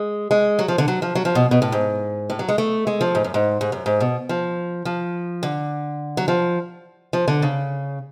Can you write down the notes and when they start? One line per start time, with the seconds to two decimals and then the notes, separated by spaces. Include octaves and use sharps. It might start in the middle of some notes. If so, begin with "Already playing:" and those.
Already playing: G#3
0.31 G#3
0.59 F#3
0.68 F3
0.78 D3
0.88 F#3
1.02 F3
1.15 F#3
1.25 F3
1.35 B2
1.51 B2
1.62 A2
1.72 G#2
2.30 A2
2.39 F#3
2.49 G#3
2.58 A3
2.87 G#3
3.01 F3
3.15 G#2
3.24 F#2
3.34 G#2
3.61 G#2
3.72 F#2
3.86 G#2
4.00 B2
4.29 F3
4.85 F3
5.43 D3
6.17 F#3
6.28 F3
7.13 F3
7.28 D3
7.42 C#3